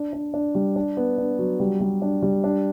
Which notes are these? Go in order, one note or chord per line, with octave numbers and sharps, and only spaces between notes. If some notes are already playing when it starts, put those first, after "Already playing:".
Already playing: D4
D4
D4
G3
D4
B3
D4
F#3
G3
G3
D4
G3
D4